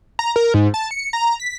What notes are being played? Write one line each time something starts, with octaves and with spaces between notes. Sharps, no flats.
A#5
A#4
G#2
A5
C#7
A#5
B6